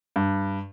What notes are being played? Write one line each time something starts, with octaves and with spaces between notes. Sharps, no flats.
G2